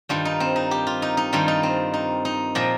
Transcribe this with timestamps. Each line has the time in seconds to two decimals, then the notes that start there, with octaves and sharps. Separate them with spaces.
0.09 G2 D#3 G3 F4
0.25 D#4
0.40 C4
0.56 D#4
0.71 G4
0.87 F4
1.02 D#4
1.17 D#4
1.33 G2 D#3 G3 F4
1.48 D#4
1.63 C4
1.94 D#4
2.25 D#4
2.55 A#2 F3 A#3